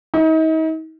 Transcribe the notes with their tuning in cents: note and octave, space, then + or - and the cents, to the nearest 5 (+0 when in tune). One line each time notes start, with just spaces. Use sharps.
D#4 +40